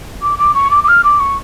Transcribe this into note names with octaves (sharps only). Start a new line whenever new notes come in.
D6
D6
C#6
D6
D6
F6
D6
C#6